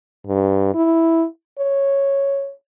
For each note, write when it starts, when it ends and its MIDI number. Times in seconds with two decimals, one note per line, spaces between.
0.27 0.71 43
0.75 1.26 64
1.59 2.52 73